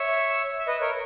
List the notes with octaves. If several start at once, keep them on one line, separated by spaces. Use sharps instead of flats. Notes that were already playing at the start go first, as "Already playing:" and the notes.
Already playing: C#5 E5
E5
B4 D#5
A#4 C#5